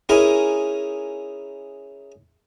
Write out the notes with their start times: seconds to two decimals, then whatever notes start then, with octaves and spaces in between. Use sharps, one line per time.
0.09 C#4 D#4 E4 G#4 A#4